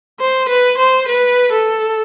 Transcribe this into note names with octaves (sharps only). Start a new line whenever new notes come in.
C5
B4
C5
B4
A4